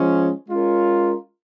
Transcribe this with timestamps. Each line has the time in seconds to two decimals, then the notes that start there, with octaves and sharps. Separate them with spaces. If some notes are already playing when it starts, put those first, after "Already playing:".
Already playing: F3 G#3 C#4
0.48 G#3 C#4 F4 A#4